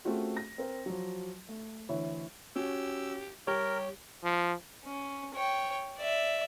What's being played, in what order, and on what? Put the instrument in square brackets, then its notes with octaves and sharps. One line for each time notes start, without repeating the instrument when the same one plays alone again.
[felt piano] A3 C4 C#4 F4 F#4 G#4
A#6
C4 A#4
F3 F#3
A3
D2 E3 E4 C#5
[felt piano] C#4 F#4 [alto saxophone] G4 [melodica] E6
[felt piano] G3 [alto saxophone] G4 [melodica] A#4 [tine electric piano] C#5
[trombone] F3
[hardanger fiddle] C#4
C#5 G5
D5 E5